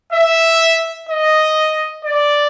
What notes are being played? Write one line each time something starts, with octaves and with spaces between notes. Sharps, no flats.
E5
D#5
D5